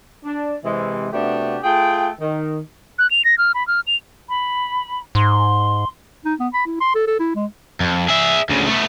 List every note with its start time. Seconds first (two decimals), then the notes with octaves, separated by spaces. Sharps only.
0.24 D4
0.64 C3 E3 G#3
1.12 C3 A3 B3 D4 F#4 G4
1.63 A3 F4 G#4 G5
2.20 D#3
2.99 F#6
3.11 F7
3.25 A#6
3.38 F6
3.55 B5
3.68 F6
3.87 F7
4.28 B5
5.15 G#2 C6
6.25 D#4
6.39 B3
6.54 B5
6.66 E4
6.81 C6
6.95 A4
7.07 A4
7.19 E4
7.35 G#3
7.81 F2
8.08 G#4 E5
8.49 D2 C#3
8.67 A3 B3